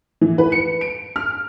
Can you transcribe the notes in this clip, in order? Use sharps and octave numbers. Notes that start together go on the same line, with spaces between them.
E3
B4
C#7
D7
F6